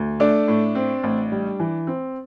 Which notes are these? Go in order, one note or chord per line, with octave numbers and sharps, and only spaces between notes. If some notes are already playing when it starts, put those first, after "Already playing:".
Already playing: D2
A3 D4 D5
A2
C4
A1
G3
E3
C4